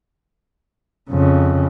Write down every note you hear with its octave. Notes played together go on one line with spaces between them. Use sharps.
F2 C#3